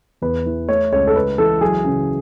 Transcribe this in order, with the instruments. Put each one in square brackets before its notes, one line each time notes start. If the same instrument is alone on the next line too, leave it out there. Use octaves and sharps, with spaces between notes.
[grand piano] E2 B4
E3
A3 C#5
C#2 C#5
A4
C#2 B4
E3 A4
F#3 G#4
C#3